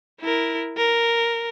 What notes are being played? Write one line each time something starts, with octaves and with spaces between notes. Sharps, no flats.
E4 A#4
A#4